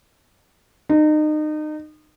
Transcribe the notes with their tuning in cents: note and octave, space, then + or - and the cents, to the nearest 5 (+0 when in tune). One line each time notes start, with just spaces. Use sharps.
D#4 -30